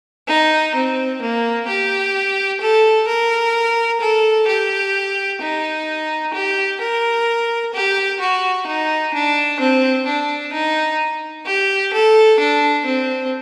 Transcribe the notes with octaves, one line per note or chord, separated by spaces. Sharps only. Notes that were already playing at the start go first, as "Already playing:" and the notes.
D#4
C4
A#3
G4
A4
A#4
A4
G4
D#4
G4
A#4
G4
F#4
D#4
D4
C4
D4
D#4
G4
A4
D4
C4